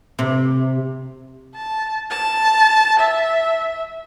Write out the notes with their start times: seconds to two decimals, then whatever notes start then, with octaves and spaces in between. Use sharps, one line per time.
0.19 C3
1.55 A5
2.11 A5
3.00 E5